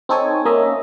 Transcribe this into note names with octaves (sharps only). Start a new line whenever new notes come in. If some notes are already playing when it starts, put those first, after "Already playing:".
C4 D#4 A4 C#5 G#5
A#3 C#4 D#5 E5